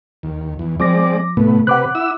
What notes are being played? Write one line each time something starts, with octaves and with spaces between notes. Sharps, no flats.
D#2
E2
F3 G#3 C4 D5 D6 A#6
A2 C3 A3 B3
C3 B4 F#5 D6 F#6
E4 E6